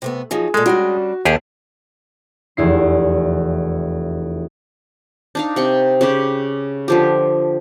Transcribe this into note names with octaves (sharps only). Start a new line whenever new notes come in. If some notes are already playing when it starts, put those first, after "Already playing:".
C3 A3 B3
F3 F#3 D#4 G#4
A#2 G#3 A4
G3 C#4 D4 F#4
D#2 D3 A#3 G4 G#4 A5
F1 E2 E4 C7
D4 D#4 F5
C3 G5 C#6
C#3 C#4 G4
D3 F3 G4